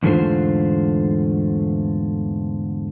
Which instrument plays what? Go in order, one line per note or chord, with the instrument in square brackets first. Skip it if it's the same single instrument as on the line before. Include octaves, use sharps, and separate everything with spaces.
[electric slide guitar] E2 G#2 D3 A3 F4 C5